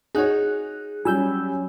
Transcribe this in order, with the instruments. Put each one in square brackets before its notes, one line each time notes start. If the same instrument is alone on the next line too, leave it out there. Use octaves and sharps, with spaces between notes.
[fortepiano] D#4 F#4 C#5 [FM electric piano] G#4 F#6
[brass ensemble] F#3 C#4 [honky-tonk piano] G3 [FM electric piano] G#5 E6 G6